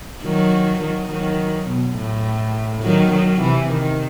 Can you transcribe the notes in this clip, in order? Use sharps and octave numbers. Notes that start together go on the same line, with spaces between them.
D#3 F#3
D#3 F#3
D#3 F#3
B2
A2
D#3 F#3
D#3 F#3
C3 E3
D#3